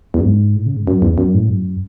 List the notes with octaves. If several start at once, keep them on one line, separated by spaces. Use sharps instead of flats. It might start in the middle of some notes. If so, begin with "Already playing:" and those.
E2
F#2
G#2
A2
C#3
G#2
F#2
E2
F#2
A2
F#2